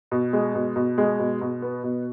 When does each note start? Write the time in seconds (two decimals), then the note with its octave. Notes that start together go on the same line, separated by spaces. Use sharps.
0.12 B2
0.33 G#3
0.55 B2
0.76 B2
0.98 G#3
1.19 B2
1.41 B2
1.62 B3
1.84 B2